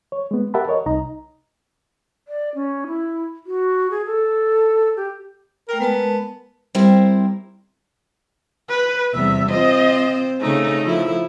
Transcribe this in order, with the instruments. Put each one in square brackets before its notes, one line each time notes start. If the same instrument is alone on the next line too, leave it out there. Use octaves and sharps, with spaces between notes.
[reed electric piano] C#5
G#3 B3
G4 A#4 E5 F#5 A5 B5
A#4 C#5 D#5
C2 D#4 D#5 A#5
[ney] D5
C#4
E4
F#4
G#4
A4
G4
[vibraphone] A3 G5 A#5 [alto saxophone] A#4
[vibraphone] G#3 A#4 A5 [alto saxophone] B3
[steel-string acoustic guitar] G3 C4 E4 A#4 C5
[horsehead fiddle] B4
[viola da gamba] E2 C3 G3 [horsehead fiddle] E5
[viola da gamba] C4 F4 C5 [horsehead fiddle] D#5
[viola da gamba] C#3 D#4 [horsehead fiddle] A3
[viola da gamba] F3 E4